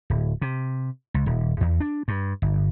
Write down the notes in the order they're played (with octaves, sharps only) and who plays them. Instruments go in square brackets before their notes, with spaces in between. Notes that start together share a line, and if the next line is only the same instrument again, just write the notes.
[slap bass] D1
C3
C#2
D#1
E2
D4
G2
G1